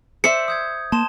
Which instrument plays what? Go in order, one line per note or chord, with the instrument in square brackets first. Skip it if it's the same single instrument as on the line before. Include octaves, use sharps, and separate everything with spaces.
[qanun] C5 D5 E5 [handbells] C#7
[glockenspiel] D#6 G6 G#6
[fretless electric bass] A#3 [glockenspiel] A5 C6 E7